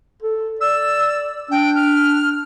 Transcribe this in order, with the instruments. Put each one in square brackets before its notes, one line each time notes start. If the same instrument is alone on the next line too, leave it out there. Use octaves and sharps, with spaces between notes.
[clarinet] A4
[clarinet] D5 [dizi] E6
[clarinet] D4 [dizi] G5
[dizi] F6